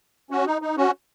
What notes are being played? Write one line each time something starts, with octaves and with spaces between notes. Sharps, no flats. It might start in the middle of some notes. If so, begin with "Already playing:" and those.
C#4 F#4
D#4
D#4
C#4 F#4